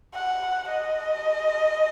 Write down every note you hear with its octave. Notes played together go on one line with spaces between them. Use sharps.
F#5
D#5